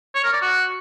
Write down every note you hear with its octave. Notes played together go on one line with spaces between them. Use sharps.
C#5
A#4
D5
F#4